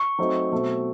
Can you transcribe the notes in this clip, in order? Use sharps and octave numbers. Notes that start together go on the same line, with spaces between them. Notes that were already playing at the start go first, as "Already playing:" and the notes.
Already playing: C#6
F#3 A3 C4 D#4
B2 F#3 A3 C4